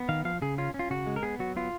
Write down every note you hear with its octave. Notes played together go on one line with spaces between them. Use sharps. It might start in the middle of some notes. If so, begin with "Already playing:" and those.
Already playing: B3
D#3 F5
F3 F5
C#3 G#4
C#4 F4
C#4
F4
C#3 F#4
G#3
A#4
B3 G#4
F#3 F#4
B3 F4